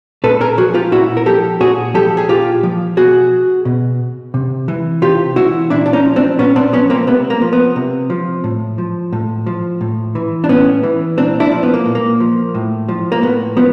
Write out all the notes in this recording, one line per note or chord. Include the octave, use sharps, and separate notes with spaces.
A#2 A4 B4
G#4 A#4
F3 F#4 G#4
F4 G4
A#2 E4 F#4
A#4
F3 G4 A4
A#2 F#4 G#4
F3 G4 A4
G#4
A#2 F4 G4
F3
B2 F#4 G#4
B2
C3
E3
C3 F4 G4
E3 E4 F#4
A#2 D4 E4
D4
C#4 D#4
F3
C4 D4
A#2 B3 C#4
C4 D4
F3 B3 C#4
A#3 C4
C3 B3
A#3
F3
B3
C3
F3
A2
F3
A2
F3
A2
E3
D4
A2 B3 C#4
E3
A#2 C4 D4
D4 E4
F3
B3
A#3
A#2
A#3
F3
A2
F3
A#3
A2 B3
F3 B3